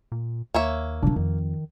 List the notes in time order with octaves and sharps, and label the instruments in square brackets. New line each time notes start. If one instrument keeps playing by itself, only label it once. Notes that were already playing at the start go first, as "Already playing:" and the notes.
[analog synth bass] A#2
[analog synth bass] D#2 [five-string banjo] A#3 C#5 E5
[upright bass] C3 F#3 [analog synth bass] D4
[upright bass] F2 [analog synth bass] D#3